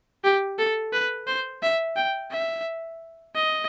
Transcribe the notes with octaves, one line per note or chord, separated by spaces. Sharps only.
G4
A4
B4
C5
E5
G5
E5
D#5